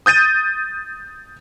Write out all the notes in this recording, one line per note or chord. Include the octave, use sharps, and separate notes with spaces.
D#6 G6 A6 D#7